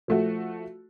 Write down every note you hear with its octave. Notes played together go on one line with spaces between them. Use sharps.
F3 A3 F#4